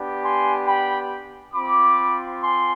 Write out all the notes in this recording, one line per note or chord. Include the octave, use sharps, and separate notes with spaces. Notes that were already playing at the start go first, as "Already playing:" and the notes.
Already playing: B3 D4 G4
G#5 C6
G5 B5
C4 F4 B5 D6
G#5 C6